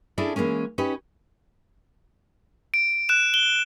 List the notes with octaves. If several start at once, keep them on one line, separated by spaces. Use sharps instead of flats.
C#4 D4 E4 G#4 A4 D5
E3 F#3 G#3 A#3 C#4
C#4 D#4 G4 B4
D7
F#6 E7
G7